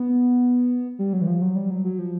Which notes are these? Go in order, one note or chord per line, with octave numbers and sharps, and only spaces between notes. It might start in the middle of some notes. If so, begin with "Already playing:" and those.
Already playing: B3
G3
F#3
E3
F3
F#3
G3
F#3
F#3
F3